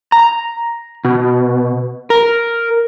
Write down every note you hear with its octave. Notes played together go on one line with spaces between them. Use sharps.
A#5
B2
A#4